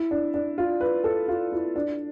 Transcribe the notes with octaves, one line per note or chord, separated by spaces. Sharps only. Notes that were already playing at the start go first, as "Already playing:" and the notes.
Already playing: E4
D4
D4
F4
B4
A4
F4
E4
D4